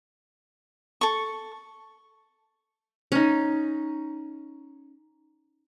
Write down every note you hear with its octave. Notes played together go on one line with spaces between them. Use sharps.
A4 C#6
C#4 D#4